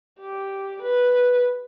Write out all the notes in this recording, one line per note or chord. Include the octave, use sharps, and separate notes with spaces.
G4
B4